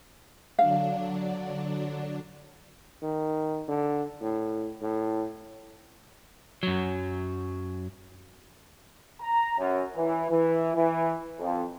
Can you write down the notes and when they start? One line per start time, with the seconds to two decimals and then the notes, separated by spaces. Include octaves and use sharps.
0.59 D3 F#3 D4 F5
3.02 D#3
3.68 D3
4.21 A2
4.82 A2
6.63 F#2 F#3
9.21 A#5
9.58 F#2
9.96 E3
10.30 E3
10.75 E3
11.40 F2